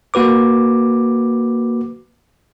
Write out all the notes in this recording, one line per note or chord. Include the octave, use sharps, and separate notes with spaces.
A#3 F#4 B4 D6